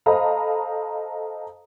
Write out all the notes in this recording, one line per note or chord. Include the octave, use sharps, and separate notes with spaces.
A4 C5 D#5 F5 A#5 B5